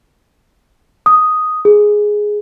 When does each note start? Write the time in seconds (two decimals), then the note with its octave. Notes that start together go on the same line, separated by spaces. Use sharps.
1.06 D#6
1.65 G#4